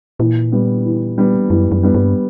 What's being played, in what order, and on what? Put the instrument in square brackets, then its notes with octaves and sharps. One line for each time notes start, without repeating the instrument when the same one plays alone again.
[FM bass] A#2 [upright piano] E3
[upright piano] G3 B3
E3
G3 B3
[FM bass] F#2 [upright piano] E3
[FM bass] F#2
[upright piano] G3 B3
[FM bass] G2